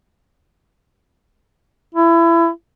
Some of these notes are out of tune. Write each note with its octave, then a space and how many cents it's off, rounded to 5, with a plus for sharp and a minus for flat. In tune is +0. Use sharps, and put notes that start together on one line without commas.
E4 +25